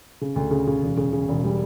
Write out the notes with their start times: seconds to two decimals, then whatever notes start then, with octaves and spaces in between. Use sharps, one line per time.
0.21 C#3
0.36 D2
0.51 C#3
0.67 C#3
0.82 E1
0.97 C#3
1.13 C#3
1.29 E1
1.44 G3